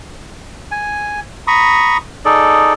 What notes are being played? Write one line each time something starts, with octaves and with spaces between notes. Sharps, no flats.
G#5
A#5 B5 C#6 D#6
D#4 G#4 A4 D5